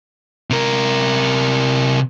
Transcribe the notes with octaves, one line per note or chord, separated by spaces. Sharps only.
C3 A#4